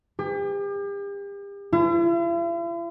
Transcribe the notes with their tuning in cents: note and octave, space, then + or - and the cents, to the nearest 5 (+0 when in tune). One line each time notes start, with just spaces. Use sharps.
G4 +40
E4 +45